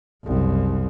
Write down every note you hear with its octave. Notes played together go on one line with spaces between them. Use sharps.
F#1 C2